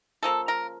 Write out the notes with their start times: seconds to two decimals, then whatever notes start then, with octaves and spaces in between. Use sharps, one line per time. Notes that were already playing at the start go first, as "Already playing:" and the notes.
0.23 C#3 F3 A#3 A4
0.48 A#4